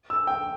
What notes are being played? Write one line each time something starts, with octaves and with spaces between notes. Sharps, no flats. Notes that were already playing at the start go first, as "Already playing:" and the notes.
E6
G5